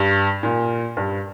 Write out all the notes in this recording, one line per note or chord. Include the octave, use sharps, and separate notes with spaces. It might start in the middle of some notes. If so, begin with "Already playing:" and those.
Already playing: G2
A#2
G2